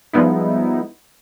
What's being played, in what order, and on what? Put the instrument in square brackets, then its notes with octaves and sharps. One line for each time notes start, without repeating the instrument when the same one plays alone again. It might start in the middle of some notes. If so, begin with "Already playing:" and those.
[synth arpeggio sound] F3 G3 G#3 B3 D#4 E4